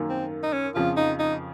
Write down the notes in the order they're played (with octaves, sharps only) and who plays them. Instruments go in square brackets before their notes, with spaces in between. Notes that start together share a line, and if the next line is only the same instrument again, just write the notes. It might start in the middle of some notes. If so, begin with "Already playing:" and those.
Already playing: [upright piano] F#2 D#3 A#3
[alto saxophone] C4
D#4
C#4
[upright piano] F2 C#3 F3 [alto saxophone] F4
[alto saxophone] D#4
D#4